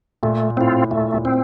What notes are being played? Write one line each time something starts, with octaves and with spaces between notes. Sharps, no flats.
A#2 A3
A2 C4 F4
A#2 A3
A#2
C4